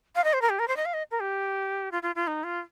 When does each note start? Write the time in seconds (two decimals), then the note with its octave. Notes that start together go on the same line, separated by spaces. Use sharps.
0.16 F5
0.24 D#5
0.33 C5
0.42 A#4
0.50 G4
0.59 A#4
0.68 C5
0.77 D#5
0.85 F5
0.94 D#5
1.11 A#4
1.20 G4
1.92 F4
2.03 F4
2.16 F4
2.27 D#4
2.44 F4